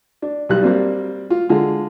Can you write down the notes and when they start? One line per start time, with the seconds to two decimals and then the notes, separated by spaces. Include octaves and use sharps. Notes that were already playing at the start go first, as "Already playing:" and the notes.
0.22 D4
0.49 B1 G3 F#6
0.62 G3 A#3 C4 D4
1.30 F4
1.49 D3 G#3 F4